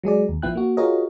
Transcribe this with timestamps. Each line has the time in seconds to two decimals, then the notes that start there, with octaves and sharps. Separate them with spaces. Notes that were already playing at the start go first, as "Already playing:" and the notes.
0.03 F#3 G#3 G#4 D5
0.29 D#2
0.42 A#1 F3 B3 E4 G5 F#6
0.55 A#3 F#4
0.77 F4 F#4 G#4 A#4 C#5 D#5